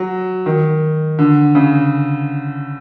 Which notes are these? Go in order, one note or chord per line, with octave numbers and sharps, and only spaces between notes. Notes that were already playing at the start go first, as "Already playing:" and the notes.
Already playing: F#3
D#3
D3
C#3